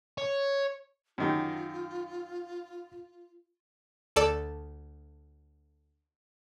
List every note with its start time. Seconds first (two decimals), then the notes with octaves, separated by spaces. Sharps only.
0.18 C#5
1.18 F#2 D#3 F4 G4
4.16 D2 A4 D5